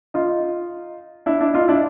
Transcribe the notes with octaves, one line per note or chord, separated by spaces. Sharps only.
D#4 F4
D4 E4
D4 E4
D#4 F4
D4 E4